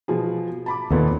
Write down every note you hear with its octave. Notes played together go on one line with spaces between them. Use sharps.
B2 F3 G#4
A5 B5 D6
D#2 A#2 B3 A4